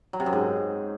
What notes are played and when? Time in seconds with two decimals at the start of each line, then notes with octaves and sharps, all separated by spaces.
0.13 F#3
0.20 C3
0.26 F#2
0.33 G#2